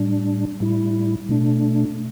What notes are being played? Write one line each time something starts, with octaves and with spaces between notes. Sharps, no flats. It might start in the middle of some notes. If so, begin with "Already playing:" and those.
Already playing: A2 G3 D4
A2 G3 E4
B2 A3 D4